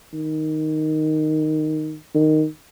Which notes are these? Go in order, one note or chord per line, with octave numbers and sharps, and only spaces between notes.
D#3
D#3